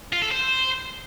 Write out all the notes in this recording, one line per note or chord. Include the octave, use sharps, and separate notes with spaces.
F4
A4
C5